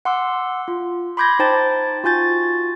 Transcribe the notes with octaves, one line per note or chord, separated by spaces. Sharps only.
F#5 C6 D6 E6
F4
B5 C6 D6 G6 G#6 A#6
D#4 C5 G5 A5 G6 A6
F4 F#4 G#5 G6 A6